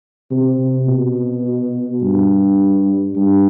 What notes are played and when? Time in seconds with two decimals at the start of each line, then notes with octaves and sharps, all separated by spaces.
0.31 C3
0.87 B2
2.02 G2
3.15 G2